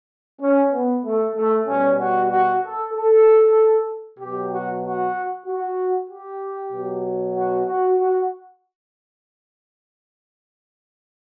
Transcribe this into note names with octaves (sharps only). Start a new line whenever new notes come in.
C#4
B3
A3
A3
B2 G3 C#4
F#4
F#4
A4
A4
B2 F#3 G4
F#4
F#4
F#4
G4
B2 F#3
F#4
F#4
F#4